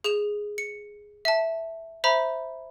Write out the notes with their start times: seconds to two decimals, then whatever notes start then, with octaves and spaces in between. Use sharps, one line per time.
0.04 G#4 E7 F7
0.58 C#7
1.25 E5 A5
2.04 C5 E5 A#5 B5